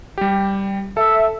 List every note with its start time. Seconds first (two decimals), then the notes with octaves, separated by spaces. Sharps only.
0.18 G3 G4
0.97 A4 E5